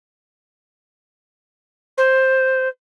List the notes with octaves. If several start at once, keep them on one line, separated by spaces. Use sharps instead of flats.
C5